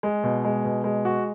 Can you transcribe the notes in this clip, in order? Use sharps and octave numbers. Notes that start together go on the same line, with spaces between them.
G#3
B2
G#3
B2
G#3
F#4